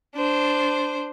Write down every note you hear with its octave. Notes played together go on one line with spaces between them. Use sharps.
D4 C5